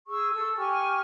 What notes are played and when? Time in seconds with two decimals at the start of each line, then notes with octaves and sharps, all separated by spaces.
0.06 G#4 C#6 E6
0.32 A4 E6
0.56 G4 G#5 C#6 F6